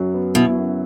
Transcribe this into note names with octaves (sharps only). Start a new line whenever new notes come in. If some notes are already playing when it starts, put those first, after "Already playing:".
Already playing: F#2 F#3
B3
B2 E4
F#2